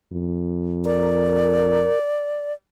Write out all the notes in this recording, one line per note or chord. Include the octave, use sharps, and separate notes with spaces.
F2
A#4 D5